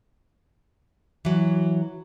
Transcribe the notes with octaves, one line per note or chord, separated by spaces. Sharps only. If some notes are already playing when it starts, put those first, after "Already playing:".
E3 F#3